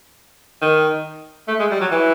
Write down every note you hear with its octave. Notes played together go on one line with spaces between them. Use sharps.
D#3
A3
G#3
G3
F#3
E3